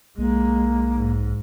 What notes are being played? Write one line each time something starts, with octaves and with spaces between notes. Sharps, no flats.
B1 G#3 A#3
G#2